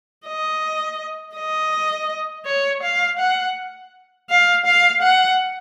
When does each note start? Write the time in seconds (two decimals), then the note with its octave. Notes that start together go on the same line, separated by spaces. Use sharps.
0.26 D#5
1.36 D#5
2.45 C#5
2.83 F5
3.19 F#5
4.30 F5
4.65 F5
5.02 F#5